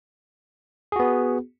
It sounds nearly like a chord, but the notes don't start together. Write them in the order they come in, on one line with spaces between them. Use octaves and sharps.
G#4 F#4 B3